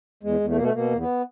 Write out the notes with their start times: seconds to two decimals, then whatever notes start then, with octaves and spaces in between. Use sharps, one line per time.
0.23 E2 G#3
0.40 E2
0.49 A3
0.56 B2 A#3
0.63 A3
0.74 B2 A#3
0.91 E2
0.99 B3